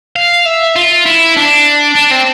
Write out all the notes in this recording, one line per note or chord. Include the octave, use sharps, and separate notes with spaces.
F5
E5
F4
E4
D4
D4
C4